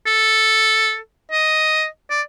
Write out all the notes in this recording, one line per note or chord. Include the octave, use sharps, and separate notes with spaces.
A4
D#5
D5